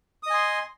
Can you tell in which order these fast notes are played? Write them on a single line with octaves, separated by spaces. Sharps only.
D#6 D#5 G#5 C6